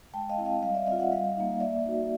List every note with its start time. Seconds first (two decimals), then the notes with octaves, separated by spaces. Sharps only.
0.14 G#3 G5 A5
0.30 D#5 F5
0.38 C4 E4
0.45 D#5 F5
0.62 G3 D#5 F5
0.74 D5 E5
0.87 C4 D#5 F5
0.92 F4
0.99 E5 F#5
1.12 G3 D#5 F5
1.37 A#3 D#4
1.60 A#3 D5 E5
1.86 D#4 F#4